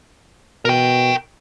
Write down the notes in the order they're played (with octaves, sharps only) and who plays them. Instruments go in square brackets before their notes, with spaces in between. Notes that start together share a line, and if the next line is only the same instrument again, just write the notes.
[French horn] B2 [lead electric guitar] A#4 G5